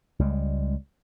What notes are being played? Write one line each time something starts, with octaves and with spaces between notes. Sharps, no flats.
C#2 G3 G#3